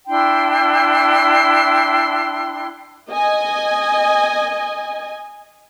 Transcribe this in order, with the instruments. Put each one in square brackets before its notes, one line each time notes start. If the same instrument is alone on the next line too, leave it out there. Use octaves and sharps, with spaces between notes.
[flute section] D4 E4 G5 C6
[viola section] D#5 G#5